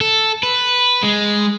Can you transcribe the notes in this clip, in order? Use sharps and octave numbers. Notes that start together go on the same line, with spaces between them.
A4
B4
G#3